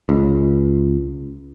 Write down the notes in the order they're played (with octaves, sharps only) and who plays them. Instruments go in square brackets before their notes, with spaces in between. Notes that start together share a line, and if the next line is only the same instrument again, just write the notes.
[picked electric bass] C#2